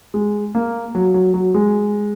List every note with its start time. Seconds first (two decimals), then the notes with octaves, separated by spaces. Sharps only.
0.14 G#3
0.55 A#3
0.95 F#3
1.14 F#3
1.34 F#3
1.54 G#3